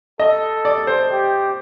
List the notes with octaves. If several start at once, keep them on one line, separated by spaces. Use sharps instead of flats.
A4 D#5
D5
C5
G4